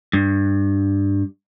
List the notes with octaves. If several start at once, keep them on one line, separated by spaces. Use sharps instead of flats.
G2